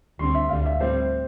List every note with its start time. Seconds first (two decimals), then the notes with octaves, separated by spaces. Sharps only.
0.19 D2 D3 G3 C4 C6
0.34 E5
0.49 D2 D3 G3 F5
0.66 E5
0.80 A2 G3 C4 C5